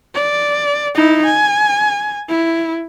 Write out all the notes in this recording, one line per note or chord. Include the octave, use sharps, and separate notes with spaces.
D5
D#4 E4
G#5
E4